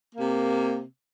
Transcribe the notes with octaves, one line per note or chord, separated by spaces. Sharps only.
C3 A#3